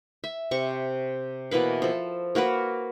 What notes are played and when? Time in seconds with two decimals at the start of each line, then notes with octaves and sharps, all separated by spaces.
0.24 E5
0.51 C3 C#6
1.51 B2 E3 A#3 B4
1.82 F3 A4
2.35 A#3 F#4 A#4 B4